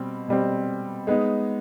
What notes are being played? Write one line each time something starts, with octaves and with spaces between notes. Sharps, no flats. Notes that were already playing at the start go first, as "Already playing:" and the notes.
Already playing: B2 G3 C4
B2 G3 C4
G#3 B3 D#4